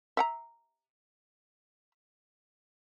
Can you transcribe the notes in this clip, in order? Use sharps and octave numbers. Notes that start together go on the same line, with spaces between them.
E5 F#5 A#5